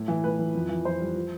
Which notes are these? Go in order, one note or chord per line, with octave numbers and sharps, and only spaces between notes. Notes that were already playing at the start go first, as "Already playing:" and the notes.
Already playing: A2
E3
A2 B4
E3
F2
E3
F2 C5
G3
F3